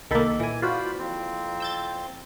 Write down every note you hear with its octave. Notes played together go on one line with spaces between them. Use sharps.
C2 D#3 A#3 A4 B5
A#2 E3 G#5
F4 F#4 C5 D5 B5
F2 C4
E6 G6 A6